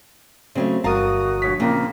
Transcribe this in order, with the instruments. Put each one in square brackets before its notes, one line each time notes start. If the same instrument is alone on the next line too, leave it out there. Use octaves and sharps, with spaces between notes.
[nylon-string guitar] C#3 F#3 A3 [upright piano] C4
[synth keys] G1 D#6 [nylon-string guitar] E2 A#4 A5 [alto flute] F#4 [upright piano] F5 A#5
[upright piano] A#1 C#5 B6
[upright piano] A#1 A#2 [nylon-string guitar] C#3 C4 [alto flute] A#3